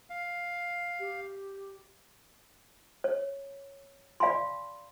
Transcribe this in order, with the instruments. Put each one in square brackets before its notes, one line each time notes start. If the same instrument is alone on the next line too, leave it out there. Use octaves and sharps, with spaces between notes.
[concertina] F5
[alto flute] G4
[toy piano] C#5
D5 F5 G#5 B5 C6